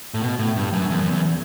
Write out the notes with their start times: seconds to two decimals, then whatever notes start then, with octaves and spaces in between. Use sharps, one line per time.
0.14 A2
0.22 B2
0.39 A2
0.56 G2
0.73 F#2
0.90 E2
1.01 F#2
1.10 E2